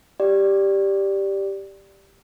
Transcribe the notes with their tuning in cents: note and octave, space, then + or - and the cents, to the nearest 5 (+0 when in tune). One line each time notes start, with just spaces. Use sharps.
G4 +0 D5 +0